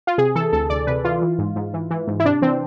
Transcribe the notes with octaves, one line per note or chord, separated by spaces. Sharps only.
F4
C3 G#4
E3 A4
D2 A4
D2 D5
C3 B4
E3 F4
E3
G#2
G#2
E3
E3
G#2
E4
C3 D4
E3 C4